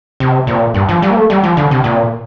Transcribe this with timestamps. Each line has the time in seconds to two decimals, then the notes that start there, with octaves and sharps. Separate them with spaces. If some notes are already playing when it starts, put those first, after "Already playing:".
0.20 C3
0.47 A#2
0.74 G2
0.89 F3
1.02 G3
1.10 A#3
1.16 A3
1.30 G3
1.43 F3
1.57 D3
1.71 C3
1.84 A#2